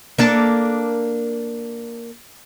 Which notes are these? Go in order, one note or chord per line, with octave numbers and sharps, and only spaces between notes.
A#3 D4 A4